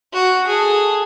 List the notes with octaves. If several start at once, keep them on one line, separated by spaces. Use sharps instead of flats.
F#4
G#4 A4